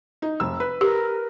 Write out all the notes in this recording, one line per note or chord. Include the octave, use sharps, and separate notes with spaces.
D#4
F1 E6
B4
G4 A#4